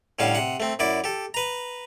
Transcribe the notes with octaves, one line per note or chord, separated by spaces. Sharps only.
A2 D3 G3 C#4 F5
C3 F#5
A3 C4
F#2 E4 D5 D6
G4 A4
B4 A#5